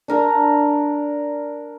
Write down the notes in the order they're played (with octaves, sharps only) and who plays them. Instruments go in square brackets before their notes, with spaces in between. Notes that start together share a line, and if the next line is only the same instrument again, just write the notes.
[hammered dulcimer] D4 A#4 A#5